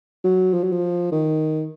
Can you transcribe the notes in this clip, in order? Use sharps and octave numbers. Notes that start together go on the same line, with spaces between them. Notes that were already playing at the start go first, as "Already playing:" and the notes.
F#3
F3
F#3
F3
D#3